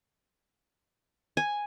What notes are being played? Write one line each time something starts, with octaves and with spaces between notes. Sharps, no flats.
G#5